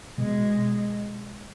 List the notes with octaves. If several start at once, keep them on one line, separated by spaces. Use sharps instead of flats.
B2 G#3